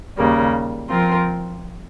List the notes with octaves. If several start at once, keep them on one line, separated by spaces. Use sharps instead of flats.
D#2 C#3 G3 A#3
F3 C4 F4 A#4